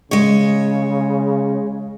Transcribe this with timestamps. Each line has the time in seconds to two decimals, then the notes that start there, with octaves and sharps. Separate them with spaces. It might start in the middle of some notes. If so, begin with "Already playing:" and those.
0.11 C#3 G#3 C#5